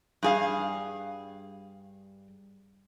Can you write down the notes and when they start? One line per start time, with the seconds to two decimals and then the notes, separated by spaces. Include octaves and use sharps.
0.23 G2 G#4 F5